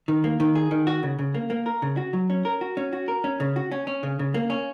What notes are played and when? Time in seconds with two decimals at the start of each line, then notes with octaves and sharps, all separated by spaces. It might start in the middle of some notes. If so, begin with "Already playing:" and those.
0.08 D#3
0.24 A#3
0.40 D#3
0.55 G#4
0.71 D#3
0.87 F#4
1.03 C#3
1.19 C#3
1.34 A#3
1.50 A#3
1.66 A#4
1.82 C#3
1.97 F#4
2.13 F#3
2.30 C#4
2.45 A#4
2.61 F#4
2.77 C#4
2.93 F#4
3.08 A#4
3.24 C#4
3.40 C#3
3.56 F#4
3.72 C#4
3.87 C#4
4.03 C#3
4.19 C#3
4.34 A#3
4.50 C#4